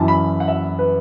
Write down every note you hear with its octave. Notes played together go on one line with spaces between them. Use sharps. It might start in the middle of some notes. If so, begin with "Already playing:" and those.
Already playing: F#2 E3 A5
B5
F#5
E5
B4